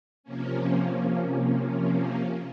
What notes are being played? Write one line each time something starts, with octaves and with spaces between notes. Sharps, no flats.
C3 F3 A#3 C#4